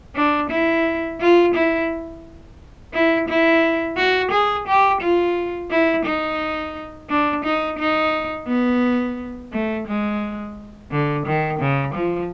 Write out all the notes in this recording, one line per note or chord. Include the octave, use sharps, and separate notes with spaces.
D4
E4
F4
E4
E4
E4
F#4
G#4
G4
F4
E4
D#4
D4
D#4
D#4
B3
A3
G#3
D3
D#3
C#3
F3